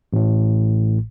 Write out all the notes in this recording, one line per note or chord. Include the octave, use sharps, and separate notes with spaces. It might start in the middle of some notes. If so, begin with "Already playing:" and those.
A1 A2